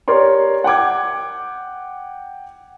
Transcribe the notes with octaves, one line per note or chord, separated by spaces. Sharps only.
G4 A#4 C#5 D5 C6
F#5 G5 D6 G#6